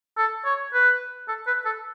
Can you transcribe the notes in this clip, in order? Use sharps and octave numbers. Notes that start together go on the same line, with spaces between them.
A4
C#5
B4
A4
B4
A4